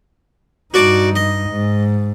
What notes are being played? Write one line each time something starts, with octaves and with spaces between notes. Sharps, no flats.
G2 D#4 F#4 D5 A5
D#5
G#2